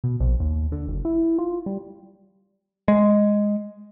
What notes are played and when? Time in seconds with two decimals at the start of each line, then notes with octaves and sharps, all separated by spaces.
0.04 B2
0.20 A#1
0.40 D#2
0.72 D3
0.87 F#1
1.05 E4
1.38 F4
1.66 G3
2.88 G#3